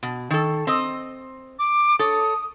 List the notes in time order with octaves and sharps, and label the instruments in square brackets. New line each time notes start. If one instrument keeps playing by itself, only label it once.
[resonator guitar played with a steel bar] B2
D#3 A4
C4 D#5
[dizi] D6
[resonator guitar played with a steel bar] A4 C#5 [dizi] D#6